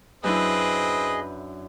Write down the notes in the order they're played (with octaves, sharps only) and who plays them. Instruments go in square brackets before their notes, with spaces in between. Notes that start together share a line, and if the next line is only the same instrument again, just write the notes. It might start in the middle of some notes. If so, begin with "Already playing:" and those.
[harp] F#2 D4 E4 [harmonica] C4 D#6 [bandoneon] G#4 D#5 [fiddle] B4